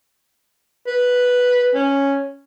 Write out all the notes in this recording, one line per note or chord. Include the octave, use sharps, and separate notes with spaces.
B4
C#4